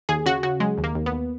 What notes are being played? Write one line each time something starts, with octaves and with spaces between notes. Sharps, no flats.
D#2 G#4
C#3 F#4
C#3 F#4
F#3 G#3
D#2
A#3
D#2
B3
D#2